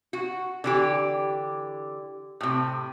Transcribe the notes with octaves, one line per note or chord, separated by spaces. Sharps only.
F#4
D3 E3 G4
A2 C3